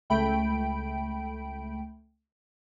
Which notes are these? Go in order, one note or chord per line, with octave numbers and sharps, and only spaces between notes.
C#2 A3 G5 B5 D7